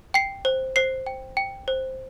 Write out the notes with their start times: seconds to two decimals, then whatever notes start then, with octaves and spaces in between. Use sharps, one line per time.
0.14 G5 C7
0.45 C5
0.76 C5 C7
1.06 G5
1.37 G5
1.68 C5